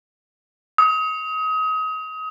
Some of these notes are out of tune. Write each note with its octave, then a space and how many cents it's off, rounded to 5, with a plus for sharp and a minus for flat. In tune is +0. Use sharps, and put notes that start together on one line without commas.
D#6 +30